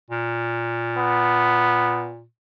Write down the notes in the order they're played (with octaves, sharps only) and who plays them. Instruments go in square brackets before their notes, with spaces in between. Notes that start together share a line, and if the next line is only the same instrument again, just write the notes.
[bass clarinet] A#2
[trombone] B3